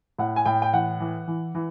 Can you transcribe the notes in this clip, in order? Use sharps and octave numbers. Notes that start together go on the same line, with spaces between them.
A2 F#5
G#5
A2 G5
G5
E3 F#5
E3
E3
E3